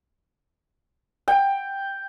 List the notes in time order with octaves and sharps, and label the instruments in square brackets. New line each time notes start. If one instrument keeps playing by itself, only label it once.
[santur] G5